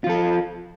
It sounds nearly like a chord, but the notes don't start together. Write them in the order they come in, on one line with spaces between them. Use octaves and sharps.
F4 F3 A4